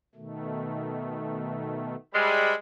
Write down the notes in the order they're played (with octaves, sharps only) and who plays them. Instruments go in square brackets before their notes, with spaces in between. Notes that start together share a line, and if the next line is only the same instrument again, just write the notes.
[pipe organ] B2 D#3 A3
[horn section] G3 G#3 [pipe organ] C5 E5 B5